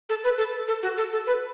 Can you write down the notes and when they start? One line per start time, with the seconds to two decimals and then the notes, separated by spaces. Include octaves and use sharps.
0.09 A4
0.24 B4
0.38 A4
0.68 A4
0.83 F#4
0.97 A4
1.12 A4
1.26 B4